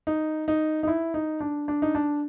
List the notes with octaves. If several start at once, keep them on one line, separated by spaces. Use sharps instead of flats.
D#4
D#4
D#4
E4
D#4
D4
D4
D#4
D4